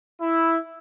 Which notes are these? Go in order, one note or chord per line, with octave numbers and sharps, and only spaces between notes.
E4